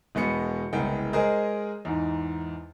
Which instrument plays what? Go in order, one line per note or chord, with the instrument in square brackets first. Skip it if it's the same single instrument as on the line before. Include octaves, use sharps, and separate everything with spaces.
[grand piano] E1 B2 G#3 B3 C#7
F#1 C2 G#3 B3 G5
G#3 G#4 A#4 C5 D#5
E2 G#2 D#4